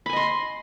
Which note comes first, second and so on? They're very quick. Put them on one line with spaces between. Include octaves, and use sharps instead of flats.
B5 G#5 D#5 C6